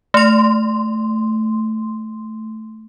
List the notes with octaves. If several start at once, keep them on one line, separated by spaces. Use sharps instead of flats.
A3 C6